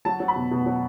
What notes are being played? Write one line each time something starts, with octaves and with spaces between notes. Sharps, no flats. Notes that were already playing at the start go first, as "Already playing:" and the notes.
F#3 A5
F#3
B5
B2
B2
F#3